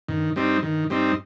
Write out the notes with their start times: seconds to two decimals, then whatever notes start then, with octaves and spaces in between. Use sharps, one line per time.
0.08 G2 D#3
0.36 G3 C4 D#4
0.63 D#3
0.90 G3 C4 D#4